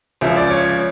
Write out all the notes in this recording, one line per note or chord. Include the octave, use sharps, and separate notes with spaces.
C#2 C#3 F3 E5
D5
C#5